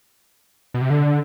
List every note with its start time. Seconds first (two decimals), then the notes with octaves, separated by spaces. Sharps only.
0.74 B2
0.81 C3
0.90 D3